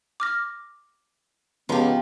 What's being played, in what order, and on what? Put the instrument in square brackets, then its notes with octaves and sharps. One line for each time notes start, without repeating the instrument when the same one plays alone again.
[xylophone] D6 F6 A#6
[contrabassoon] C#2 [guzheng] F3 G4 [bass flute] B3